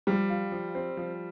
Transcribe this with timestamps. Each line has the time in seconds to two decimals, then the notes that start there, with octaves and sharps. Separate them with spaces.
0.07 F3 G3
0.30 F4
0.52 F3
0.75 C4
0.97 F3